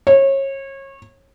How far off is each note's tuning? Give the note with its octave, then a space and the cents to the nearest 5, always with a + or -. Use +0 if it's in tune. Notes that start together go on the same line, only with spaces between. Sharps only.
C#5 -30